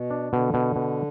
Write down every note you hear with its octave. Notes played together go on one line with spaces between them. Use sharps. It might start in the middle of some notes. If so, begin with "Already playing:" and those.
Already playing: B2
D4
B2 D3
B2
B2